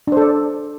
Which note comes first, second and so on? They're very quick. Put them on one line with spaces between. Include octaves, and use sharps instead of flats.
D4 C5 A4 D5